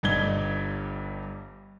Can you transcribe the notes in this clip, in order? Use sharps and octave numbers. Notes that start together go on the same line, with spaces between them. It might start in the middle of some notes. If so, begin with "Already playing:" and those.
G1 G2 G3 D#4 G#6 G7